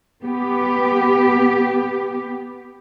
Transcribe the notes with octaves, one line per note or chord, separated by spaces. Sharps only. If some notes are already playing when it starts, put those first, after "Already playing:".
B3 G4